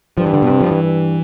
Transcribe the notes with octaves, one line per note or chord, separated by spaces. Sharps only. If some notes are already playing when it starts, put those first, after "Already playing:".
G2 F3
E3
D3
B2
C3
F3
E3
G2